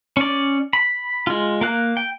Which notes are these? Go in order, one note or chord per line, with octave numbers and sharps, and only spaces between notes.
C#4 D5
B5
G#3 F4
A#3 F5 F#6
G5